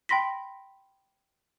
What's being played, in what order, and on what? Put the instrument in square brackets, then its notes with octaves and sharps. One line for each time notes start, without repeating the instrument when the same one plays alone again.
[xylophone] G5 B5 C6 A#6 B6